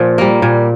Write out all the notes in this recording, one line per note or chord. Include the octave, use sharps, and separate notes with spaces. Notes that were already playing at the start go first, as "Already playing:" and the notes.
Already playing: A#2 F3
G3 A#3
A#2